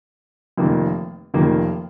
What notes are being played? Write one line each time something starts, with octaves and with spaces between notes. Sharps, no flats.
F1 F2 D#3 A#3
F1 F2 D#3 A#3